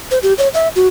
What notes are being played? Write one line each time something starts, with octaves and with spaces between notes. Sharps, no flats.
C5
G4
C#5
E5
F#4